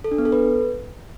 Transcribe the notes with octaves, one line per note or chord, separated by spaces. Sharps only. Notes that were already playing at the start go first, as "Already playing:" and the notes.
A4
D4
B3
A4
B4